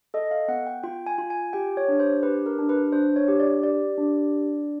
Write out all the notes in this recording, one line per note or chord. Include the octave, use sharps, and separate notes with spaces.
A4 D#5
F5
B3 F#5
G5
F4 G5
G#5
F4
G#5
G4 G5
C#5
D4
C5
G4 B4
A#4
D4
B4
D4 C5
C#5
G4
D5
G4 D5
D4